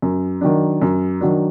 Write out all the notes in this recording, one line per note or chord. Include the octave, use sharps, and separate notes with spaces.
F#2
D#3 F#3 D4
F#2
D#3 F#3 D4